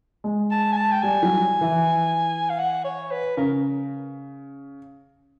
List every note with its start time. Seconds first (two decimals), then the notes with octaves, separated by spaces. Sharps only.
0.24 G#3
0.51 A5
0.72 G#5
0.77 A5
0.92 G5
1.02 G3 G#5
1.23 F#3
1.61 E3
2.50 F5
2.59 F#5
2.84 C#5
3.11 B4
3.37 C#3 A#4